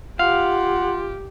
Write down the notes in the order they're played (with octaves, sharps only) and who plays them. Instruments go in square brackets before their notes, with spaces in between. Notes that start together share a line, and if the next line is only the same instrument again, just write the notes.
[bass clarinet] F4 [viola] G4 [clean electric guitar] F5 [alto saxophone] F#5